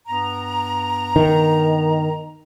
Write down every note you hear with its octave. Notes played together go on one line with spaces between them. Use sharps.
G2 B3 A#5
D#3